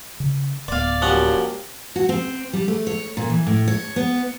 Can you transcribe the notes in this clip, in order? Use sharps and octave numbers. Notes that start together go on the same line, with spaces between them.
C#3
D1 B3 D5 F5
F3 F#3 A#3 C#4 G4 F#5
F#4
C4
G3
A3
C#5
A#2
E3
A2
C#5
B3